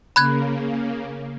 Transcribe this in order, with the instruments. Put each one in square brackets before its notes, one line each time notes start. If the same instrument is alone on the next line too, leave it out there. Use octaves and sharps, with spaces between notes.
[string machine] C#3 A#3 [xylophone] B5 F#6 G#6